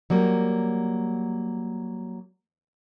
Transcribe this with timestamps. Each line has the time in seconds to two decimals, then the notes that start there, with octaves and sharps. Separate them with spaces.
0.10 F#3 G3 A#3